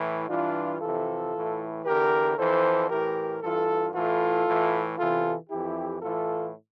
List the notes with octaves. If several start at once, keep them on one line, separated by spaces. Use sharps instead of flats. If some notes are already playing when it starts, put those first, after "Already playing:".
Already playing: A2 E3
G2 E3 D4 F4
F2 C3 E3 F4 A4
A2 E3
E2 D3 G4 A#4
F2 E3 A4 C5
A2 E3 G4 A#4
G2 E3 F4 A4
A2 E3 F4 A4
A2 E3
E2 C3 E3 F4 A4
F2 E3 E4 G4
A2 E3 F4 A4